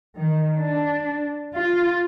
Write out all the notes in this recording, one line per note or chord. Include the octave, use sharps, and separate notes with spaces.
D#3
D4
F4